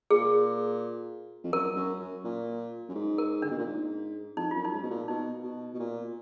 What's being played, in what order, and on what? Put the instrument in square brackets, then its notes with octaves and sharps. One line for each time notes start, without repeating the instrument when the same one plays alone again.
[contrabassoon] A#2 [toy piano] G#4
[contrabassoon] F2
[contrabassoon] F#2 [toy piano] A#4
[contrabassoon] F#2
F#2
A#2
F#2
G#2
[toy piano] A#4
[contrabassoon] D3 [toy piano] D4
[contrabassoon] B2
A#2
G#2
[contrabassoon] F2 [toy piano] D#4
[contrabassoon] F#2 [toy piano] F4
[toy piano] D#4
[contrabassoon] G#2
B2
A#2
[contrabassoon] B2 [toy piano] D#4
[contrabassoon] B2
B2
A#2